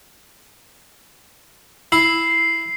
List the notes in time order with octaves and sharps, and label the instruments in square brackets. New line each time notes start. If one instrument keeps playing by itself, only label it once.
[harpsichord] E4 [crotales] C7